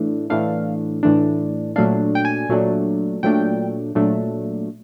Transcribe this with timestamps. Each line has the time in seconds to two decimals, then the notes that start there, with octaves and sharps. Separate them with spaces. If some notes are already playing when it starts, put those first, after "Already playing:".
Already playing: A2 E3 A3 D4
0.30 A2 E3 A3 D4 F5
1.03 A2 E3 A3 D4
1.76 A#2 F#3 A3 D4 F5
2.15 G5
2.25 G#5
2.49 A#2 F#3 A3 D4
3.23 A#2 F#3 A3 D4 G5
3.95 A#2 F#3 A3 D4